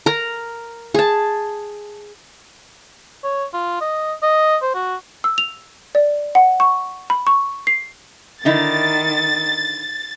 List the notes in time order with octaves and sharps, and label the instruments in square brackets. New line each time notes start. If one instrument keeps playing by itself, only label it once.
[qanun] A#4 A#5
G#4 A5
[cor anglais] C#5
F4
D#5
D#5
C5
F#4
[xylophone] E6
F7
D5
F#5
C#6
B5
C#6
C7
[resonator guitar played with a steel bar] D3 D#4 E4 [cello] D#3 [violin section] A6